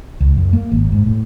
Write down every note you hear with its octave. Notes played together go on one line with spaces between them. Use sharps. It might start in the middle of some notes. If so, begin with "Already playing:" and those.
C#2
F#2
A#3
G#1
G#2
A2